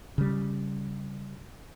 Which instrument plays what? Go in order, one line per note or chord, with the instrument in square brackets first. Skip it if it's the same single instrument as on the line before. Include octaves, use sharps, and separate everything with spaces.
[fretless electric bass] C#3 G3